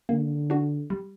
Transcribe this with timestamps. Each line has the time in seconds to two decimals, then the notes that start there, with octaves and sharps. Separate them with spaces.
0.09 D3 A#3
0.50 D4 F#4
0.90 G3